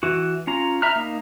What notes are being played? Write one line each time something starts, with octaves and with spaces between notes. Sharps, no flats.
E3 F#4
C#4 F4 A#5
E5 A#5 B5 F6
A#3 D#4